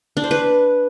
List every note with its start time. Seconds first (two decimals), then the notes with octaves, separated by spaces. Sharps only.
0.17 D4
0.24 C5
0.31 B4